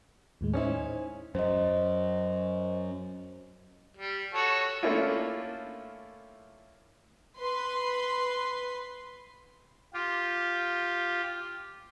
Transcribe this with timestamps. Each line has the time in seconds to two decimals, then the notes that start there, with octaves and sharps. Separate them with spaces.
0.41 D#2 A2 G#3
0.53 C#4 D#4 E4 C5 G#5
1.35 F#2 C5 D#5
3.97 G3
4.34 F#4 A4 C#5
4.83 A3 A#3 C#4 D4 E4 F4
7.37 B4 C6
9.93 F4 G4